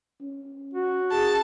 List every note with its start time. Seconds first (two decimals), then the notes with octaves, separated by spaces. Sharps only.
0.22 C#4
0.74 F#4
1.12 G#4 A5